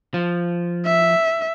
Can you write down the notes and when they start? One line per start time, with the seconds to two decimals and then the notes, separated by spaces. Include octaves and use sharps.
0.14 F3
0.86 E5